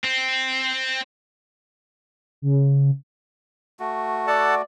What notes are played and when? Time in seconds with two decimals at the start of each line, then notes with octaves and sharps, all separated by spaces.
0.04 C4
2.42 C#3
3.80 A3 F#4
4.27 A4 D5 F#5 A5